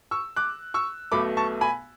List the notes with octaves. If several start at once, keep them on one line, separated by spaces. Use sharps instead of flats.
C#6 E6
D6 F#6
C#6 E6
B1 B2 A3 B5 D6
A5 C#6
G#5 B5